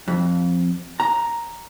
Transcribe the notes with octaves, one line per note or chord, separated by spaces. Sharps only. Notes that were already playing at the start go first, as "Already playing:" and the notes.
F2
A#5